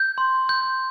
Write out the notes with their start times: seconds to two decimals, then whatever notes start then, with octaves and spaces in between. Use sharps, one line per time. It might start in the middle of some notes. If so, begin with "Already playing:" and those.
Already playing: G6
0.18 C6
0.49 G6